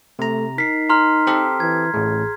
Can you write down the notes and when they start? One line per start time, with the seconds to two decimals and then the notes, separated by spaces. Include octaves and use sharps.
0.19 C3 A3 A#5
0.58 D#4 A#4 B6 C7
0.89 A#5 C6 F6
1.27 C4 G4 A4
1.60 E3 G#6
1.94 A1 A2 G#4